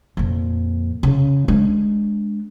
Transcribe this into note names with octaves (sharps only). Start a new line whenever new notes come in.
F2 A#2
C#3
G#3 D4